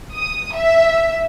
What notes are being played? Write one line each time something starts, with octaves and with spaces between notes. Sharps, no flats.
D#6
E5